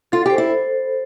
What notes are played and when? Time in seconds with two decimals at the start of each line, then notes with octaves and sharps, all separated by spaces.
0.12 F4 A4
0.26 G4 C5
0.38 E4